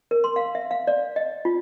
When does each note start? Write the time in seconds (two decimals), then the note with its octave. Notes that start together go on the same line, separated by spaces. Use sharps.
0.11 A#4
0.24 C6
0.36 F5
0.55 E5
0.71 F5
0.87 D5
1.16 D#5
1.45 F4